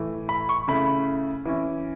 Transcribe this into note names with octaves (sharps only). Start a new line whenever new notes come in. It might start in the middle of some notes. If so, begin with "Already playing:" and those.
Already playing: A2 E3 A3
B5
C#6
C#3 A3 E4 B5
E3 C#4 E4